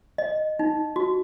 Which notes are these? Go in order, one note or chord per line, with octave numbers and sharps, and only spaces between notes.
D#5
D#4
F#4